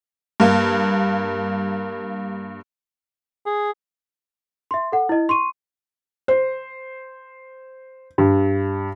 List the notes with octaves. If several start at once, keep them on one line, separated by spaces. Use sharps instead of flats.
G2 A#3
G#4
E5 C6
A4 F#5
E4 D#5
C6 C#6 D#7
C5
G2